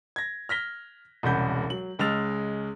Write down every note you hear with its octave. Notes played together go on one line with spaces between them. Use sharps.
G#6 A#6
F6 A#6 B6 G7
E1 C2 C#3 F#5 B5 G6
F#3 F#7
C#2 G#3 E6 F6 A6 F7